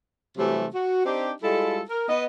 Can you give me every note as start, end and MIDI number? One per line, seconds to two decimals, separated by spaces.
0.38 0.67 48
0.38 0.67 52
0.38 0.67 54
0.38 0.67 55
0.38 0.67 57
0.38 0.67 60
0.74 1.04 66
1.05 1.33 60
1.05 1.33 62
1.05 1.33 63
1.05 1.33 67
1.43 1.82 55
1.43 1.82 56
1.43 1.82 64
1.43 1.82 65
1.43 1.82 69
1.90 2.06 70
2.09 2.25 59
2.09 2.25 75